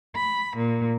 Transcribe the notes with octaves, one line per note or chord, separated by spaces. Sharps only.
B5
A#2